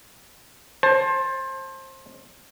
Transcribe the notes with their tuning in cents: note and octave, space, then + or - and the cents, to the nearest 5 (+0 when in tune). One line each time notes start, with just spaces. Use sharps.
C5 +25 A5 +0